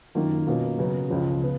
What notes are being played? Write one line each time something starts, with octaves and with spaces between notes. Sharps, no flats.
F#2 D#3 A#3 F4
B2 A#3 C#4 F4
C#3 F#3 B3
C#2 C#3 F3
B3